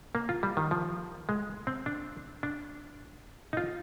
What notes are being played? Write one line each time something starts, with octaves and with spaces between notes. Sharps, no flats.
A#3
F4
G3
D#3
F3
G#3
C4
D4
D4
D#4
F4